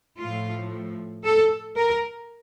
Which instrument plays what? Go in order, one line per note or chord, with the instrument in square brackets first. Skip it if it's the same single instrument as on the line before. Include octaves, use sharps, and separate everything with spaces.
[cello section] A2 F3 A3 F4
A4
A#4